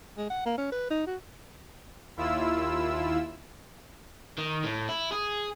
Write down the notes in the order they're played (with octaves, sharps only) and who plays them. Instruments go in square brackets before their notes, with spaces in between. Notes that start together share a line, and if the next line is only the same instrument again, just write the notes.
[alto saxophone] G#3
F#5
A#3
C#4
B4
D#4
F#4
[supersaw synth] D#2 E4 F4 E6
[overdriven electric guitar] D#3
A2
E4
G#4